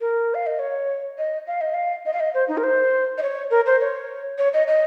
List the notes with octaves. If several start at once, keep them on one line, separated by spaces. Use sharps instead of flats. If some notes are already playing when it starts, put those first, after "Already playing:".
A#4
F5
D#5
C#5
D#5
F5
D#5
F5
D#5
F5
D#5
C5
D#4
A#4
C5
D#5
C#5
A#4
C5
C#5
C#5
D#5
D#5